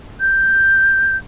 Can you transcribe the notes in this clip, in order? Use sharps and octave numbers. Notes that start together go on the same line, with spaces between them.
G6